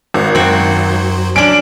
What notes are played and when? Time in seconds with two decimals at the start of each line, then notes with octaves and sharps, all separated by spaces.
0.14 G#1 F#4
0.35 F#2 F#3 C4 F#4 C5
1.36 F#3 C#4 D4 D7 F#7